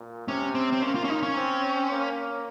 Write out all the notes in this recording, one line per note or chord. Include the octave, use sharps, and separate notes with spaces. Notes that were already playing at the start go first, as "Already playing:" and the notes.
Already playing: A#2
C3 C#4
C4
C4
A#3 C#4
F4
C#4
D#4
C#4
C4
A#3